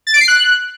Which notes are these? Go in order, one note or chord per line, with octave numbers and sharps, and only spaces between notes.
A6
D7
C7
F#6